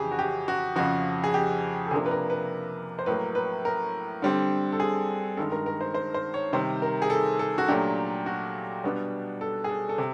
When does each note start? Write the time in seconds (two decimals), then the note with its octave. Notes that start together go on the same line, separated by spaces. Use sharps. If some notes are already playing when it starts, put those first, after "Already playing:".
Already playing: F2 C#3 E3 G4 G#4
0.11 F#4
0.19 G4
0.48 F#4
0.76 F2 C#3 F3 F#4
1.24 G#4
1.34 G4
1.87 A4
1.91 C3 F3 A#3 D4 G#4
2.06 B4
2.11 A#4
2.30 B4
2.99 C5
3.06 A2 F#3 A#3 B4
3.35 B4
3.65 A#4
4.22 D3 G3 C4
4.72 A4
4.80 G#4
5.37 G2 D#3 G#3 A4
5.52 A#4
5.66 A#4
5.81 C5
5.94 C5
6.14 C5
6.34 C#5
6.53 C3 D#3 G3 C5
6.82 A#4
7.02 G#4
7.10 A4
7.39 A4
7.58 F#4
7.68 A#2 F#3 A3 D4 G4
8.26 F#4
8.84 B2 G3 B3 D4
9.41 A4
9.64 G#4
9.69 A4
9.89 A4
9.98 C3